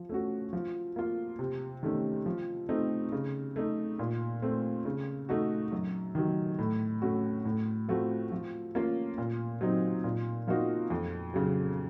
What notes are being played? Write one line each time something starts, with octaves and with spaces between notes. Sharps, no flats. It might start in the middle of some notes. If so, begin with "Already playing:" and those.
Already playing: F3
A3 C#4 F#4
F3
A#3 F4
C3
D#3 A3 C#4
F3
A3 C4 D#4
C#3
A3 D#4
A#2
A3 C4
C#3
A3 D#4 F#4
F#2
D#3 F#3
A2
A3 C#4 F#4
A2
F3 A3 C4 F#4
F3
A#3 C#4 F4
A#2
F#3 C4 D#4
A#2
F3 A#3 D#4 F#4
F2
C#3 F#3